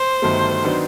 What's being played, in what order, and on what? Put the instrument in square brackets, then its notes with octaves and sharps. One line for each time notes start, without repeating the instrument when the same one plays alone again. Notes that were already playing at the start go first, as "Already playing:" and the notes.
Already playing: [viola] C5
[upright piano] G1 G2 D#3 F#3 A3
D#3 F#3 B3 D4